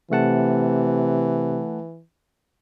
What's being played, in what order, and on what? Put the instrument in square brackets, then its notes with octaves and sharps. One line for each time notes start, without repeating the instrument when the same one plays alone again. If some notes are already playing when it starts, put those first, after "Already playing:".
[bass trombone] C3 [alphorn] E3 [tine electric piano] A3 F#5 A5